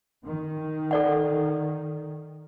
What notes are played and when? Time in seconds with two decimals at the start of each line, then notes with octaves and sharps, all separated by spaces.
0.25 D#3
0.91 A4 D5 F#5